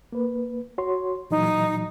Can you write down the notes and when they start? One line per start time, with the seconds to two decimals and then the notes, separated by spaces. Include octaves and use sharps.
0.13 A#3 B4
0.78 F#4 C#5 C6
1.31 A#2 E3 F#3 D#4